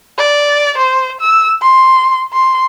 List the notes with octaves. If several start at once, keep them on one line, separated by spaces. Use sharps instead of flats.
D5
C5
E6
C6
C6